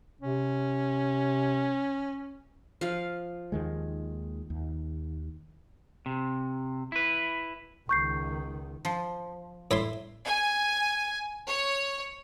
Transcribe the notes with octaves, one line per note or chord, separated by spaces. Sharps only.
C3 C#4
F3 F5
D#2 D#3 G#3
D#2
C3
E4 B4
C#2 D#3 C#6 G6 C7
F3
A2 E4 C6
G#5
C#5